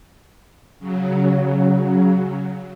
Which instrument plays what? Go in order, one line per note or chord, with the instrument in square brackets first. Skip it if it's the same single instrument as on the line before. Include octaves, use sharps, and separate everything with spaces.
[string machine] C#3 F#3